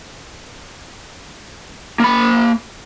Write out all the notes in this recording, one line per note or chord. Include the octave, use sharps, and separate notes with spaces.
A#3 B5